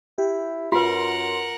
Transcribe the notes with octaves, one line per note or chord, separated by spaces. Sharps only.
E4 G4
F#2 F4 A#4 B4 F#5 C6